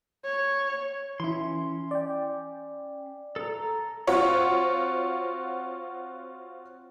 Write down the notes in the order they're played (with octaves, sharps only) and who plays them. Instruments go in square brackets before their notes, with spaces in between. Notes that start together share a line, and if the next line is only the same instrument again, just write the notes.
[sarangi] C#5
[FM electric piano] E3 E4 [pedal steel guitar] C#4 C6
[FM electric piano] D5 G5
[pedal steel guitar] A4 A#5
[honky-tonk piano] C4 F4 F#4 C#5